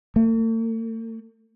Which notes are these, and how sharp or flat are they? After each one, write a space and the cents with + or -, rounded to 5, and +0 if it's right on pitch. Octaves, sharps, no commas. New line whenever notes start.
A3 +45